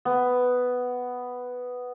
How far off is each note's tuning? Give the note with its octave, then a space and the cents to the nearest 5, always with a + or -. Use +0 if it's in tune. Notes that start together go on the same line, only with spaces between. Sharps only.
B3 +5